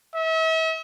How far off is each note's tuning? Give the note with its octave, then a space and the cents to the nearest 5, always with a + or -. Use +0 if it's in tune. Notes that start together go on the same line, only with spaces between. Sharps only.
E5 -40